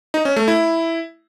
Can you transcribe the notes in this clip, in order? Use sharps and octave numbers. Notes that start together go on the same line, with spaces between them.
D#4
C#4
A3
E4